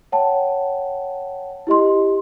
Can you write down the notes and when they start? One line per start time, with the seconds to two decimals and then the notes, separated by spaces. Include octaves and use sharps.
0.12 C#5 F#5 G5 A5
1.67 E4 G4 D#5 C6